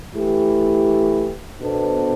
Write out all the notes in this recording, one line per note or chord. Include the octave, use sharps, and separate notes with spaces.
E3 A3 E4 G4
B2 B3 D4 A4 C5